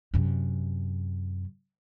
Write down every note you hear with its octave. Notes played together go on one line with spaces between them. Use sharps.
F#2 C3